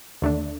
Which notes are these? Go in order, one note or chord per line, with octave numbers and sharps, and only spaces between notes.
D#2 D3 A3 D4